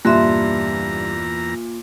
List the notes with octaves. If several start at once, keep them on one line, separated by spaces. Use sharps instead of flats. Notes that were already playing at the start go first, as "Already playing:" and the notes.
E2 G2 A#2 E5 A#5 C6 F#6